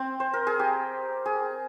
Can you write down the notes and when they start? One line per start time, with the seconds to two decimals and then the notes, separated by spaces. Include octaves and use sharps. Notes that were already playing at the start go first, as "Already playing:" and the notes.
Already playing: C4
0.20 C5
0.34 A#4
0.47 G#4
0.59 G4
1.26 G#4